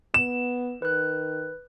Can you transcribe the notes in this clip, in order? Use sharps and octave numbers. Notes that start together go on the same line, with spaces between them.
B3 E7
D#3 B4 F#6